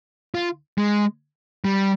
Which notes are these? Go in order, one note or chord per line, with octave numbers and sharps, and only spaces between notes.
F4
G#3
G3